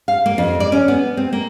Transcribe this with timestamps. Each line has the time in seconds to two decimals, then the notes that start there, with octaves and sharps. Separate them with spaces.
0.08 F5
0.26 A#3
0.38 F2
0.60 D5
0.72 C#4
0.88 B3
1.17 C4
1.33 A#3